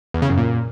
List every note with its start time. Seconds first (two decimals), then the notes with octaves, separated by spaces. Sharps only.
0.14 E2
0.22 C#3
0.30 F#2
0.38 A#2